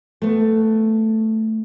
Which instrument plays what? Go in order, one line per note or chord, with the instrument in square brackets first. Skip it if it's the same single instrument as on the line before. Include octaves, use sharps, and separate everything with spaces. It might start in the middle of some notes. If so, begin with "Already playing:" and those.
[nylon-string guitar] A3 B3